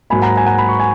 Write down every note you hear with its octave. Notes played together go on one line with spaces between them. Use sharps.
G#2 F#3 A#3 G#5 B5
F#5 A#5
G#5
F#5 A#5
B5
C#6
G#5